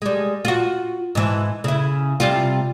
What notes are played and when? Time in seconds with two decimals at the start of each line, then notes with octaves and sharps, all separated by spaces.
0.02 G3 G#3
0.45 F4 F#4
1.15 G#2 E3
1.64 C#3 E4
2.20 C3 G3 F4